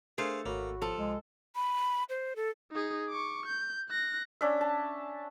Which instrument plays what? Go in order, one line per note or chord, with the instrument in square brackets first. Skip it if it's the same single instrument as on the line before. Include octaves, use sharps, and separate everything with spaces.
[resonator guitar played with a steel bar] A3 [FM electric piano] D4 A#4 [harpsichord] G#4 C5 F5
[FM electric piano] G#1 C#5 B5 [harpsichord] A#3 [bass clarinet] F#4
[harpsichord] F3 [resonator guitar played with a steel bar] A4
[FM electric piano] C2 [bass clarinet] G#3
[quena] B5
C5
A4
[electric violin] D#4 G#4
C#6 D6
G6
F#6 A#6
[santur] C#4 D4 E5
A5